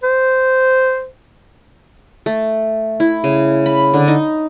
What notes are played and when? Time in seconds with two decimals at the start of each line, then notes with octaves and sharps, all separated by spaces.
0.03 C5
2.26 A3
3.00 E4
3.24 C#3
3.66 B5
3.94 D3
4.08 D#4